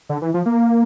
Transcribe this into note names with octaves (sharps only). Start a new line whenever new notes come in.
D3
E3
F3
A#3